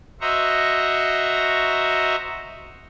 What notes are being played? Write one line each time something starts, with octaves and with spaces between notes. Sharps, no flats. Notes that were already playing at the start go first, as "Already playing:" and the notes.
F#4 C5 D#5 E5 A#5 C#6